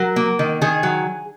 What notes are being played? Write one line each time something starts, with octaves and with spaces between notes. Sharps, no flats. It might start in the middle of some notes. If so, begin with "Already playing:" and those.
Already playing: F#3 A#4
A#3
D#3
D#3 G#4
F#3